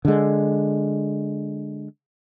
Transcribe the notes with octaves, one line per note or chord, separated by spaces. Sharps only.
D3 G#3